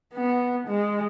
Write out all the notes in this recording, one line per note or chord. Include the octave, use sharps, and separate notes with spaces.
B3
G#3